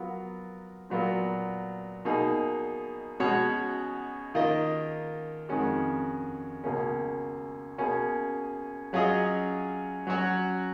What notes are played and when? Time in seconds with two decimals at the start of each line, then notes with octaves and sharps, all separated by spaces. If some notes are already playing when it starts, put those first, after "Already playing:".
Already playing: F#3 B3 F4 A#4
0.90 A#2 F#3 B3 F4 A#4
2.05 B2 A#3 D#4 G#4
3.20 B2 G#3 C#4 F#4 C#5
4.35 D#3 A#3 F4 A#4 D#5
5.49 F2 D#3 G#3 C#4 F#4
6.64 C#2 B2 A#3 C#4
7.78 B2 A#3 C#4 G#4
8.93 F#3 C#4 F4 G#4 D#5
10.07 F#3 C#4 F#4 C#5